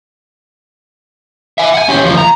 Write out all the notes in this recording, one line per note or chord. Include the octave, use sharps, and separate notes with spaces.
E5 G#5
F#5 G#5
C#4 G4
D2 F3
A#5